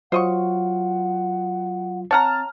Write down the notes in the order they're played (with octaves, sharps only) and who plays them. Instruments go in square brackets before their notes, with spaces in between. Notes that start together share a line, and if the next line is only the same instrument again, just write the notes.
[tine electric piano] F#3 F4 [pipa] C5 D#5 C#6 [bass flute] F#5
[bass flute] C4 [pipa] C#5 F#5 A#5 [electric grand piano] A5 F6